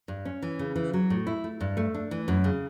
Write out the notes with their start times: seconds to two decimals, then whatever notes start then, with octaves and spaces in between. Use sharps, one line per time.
0.08 G2
0.25 C#4
0.42 E3
0.59 C#3
0.76 E3
0.93 F#3
1.10 A2
1.27 E4
1.44 A3
1.61 G2
1.77 A3
1.94 D4
2.11 E3
2.28 F#2
2.44 C#3